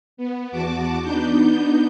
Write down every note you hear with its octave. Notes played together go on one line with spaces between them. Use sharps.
B3
E2 F#4 A5 D6
B3 D4 D#4 G6